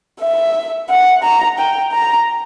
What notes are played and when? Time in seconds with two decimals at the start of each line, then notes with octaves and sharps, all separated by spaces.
0.21 E5
0.90 F#5
1.24 A#5
1.59 G5
1.93 A#5